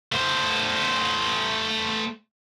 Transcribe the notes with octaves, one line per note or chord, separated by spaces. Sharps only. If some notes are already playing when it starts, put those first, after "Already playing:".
A3 C5